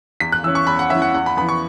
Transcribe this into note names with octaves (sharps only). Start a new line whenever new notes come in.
E2 B6
F#6
E3 C#4 E6
C#6
E2 B5
F#5
E3 C#4 E5
F#5
E2 F#5
B5
E3 B3 B5
C#6